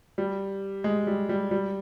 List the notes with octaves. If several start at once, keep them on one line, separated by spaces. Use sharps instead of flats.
G3
G#3
G3
G3
G3